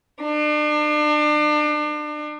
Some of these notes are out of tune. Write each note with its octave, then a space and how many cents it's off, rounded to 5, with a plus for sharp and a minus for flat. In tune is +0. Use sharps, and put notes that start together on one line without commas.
D4 +35